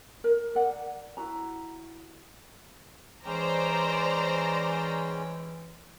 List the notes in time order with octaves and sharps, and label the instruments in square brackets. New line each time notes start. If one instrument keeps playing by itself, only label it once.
[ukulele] A#4
A#4 D5 F#5
E4 F#4 A#5
[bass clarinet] E3 [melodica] G#3 C#4 G5 [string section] C5 D5 A#5